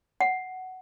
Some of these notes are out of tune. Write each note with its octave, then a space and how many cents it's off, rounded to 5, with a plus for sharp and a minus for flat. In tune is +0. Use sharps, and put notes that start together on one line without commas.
F#5 +10